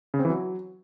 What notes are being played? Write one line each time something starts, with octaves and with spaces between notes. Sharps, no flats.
C#3
C4
E3
F#3